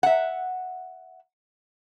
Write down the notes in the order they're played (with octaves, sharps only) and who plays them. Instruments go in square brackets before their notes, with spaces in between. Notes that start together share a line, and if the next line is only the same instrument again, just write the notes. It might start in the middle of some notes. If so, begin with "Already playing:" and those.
[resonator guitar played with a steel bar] E5 F#5